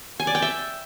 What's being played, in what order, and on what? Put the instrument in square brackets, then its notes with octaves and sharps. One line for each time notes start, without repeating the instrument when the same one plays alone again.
[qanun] G#5
D5
G5
E5